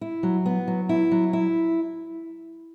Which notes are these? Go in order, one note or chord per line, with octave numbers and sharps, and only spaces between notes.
E4
F#3
B3
F#3
E4
F#3
E4